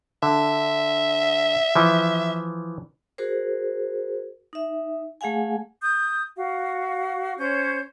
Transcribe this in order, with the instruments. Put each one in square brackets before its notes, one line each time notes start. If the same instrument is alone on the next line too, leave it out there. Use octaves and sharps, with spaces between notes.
[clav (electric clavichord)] D3 [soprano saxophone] E5
[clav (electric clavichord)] E3 F3
[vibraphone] F#4 G#4 A#4 C5
D#4 E5
A3 G#4 F5 F#5 G#5
[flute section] D#6 G6
F#4 F5
C#4 C5 C#5 G6